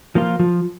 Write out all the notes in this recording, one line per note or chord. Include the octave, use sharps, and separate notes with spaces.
F3 A#3 F4
F3